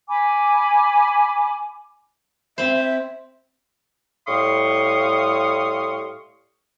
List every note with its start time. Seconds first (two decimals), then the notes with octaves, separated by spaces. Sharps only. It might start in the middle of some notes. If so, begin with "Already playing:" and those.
0.09 G#5 B5 D6
2.58 C4 C5 E5
2.76 E5
4.27 A2 G3 F5 C6 C#6 D#6